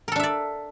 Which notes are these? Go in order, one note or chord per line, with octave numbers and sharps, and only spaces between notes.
D4 A4 A#4 D5 E5